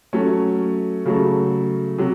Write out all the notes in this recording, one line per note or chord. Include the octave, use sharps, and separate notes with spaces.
F#3 A3 C#4
C#3 F#3 A3
C3 F#3